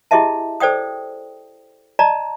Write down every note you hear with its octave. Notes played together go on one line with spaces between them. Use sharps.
E4 G4 G#4 D#5 E5 A5
A4 C5 D5 G5 D#6
D5 D#5 A5 A#5